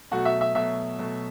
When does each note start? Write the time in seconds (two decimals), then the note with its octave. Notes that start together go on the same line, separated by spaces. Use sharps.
0.11 B2 F#3 A3 F#4
0.25 E5
0.41 E5
0.55 B2 F#3 A3 E5
0.99 B2 F#3 A3